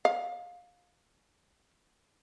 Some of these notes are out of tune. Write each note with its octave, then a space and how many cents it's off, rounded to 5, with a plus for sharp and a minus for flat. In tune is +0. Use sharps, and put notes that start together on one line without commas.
F5 +25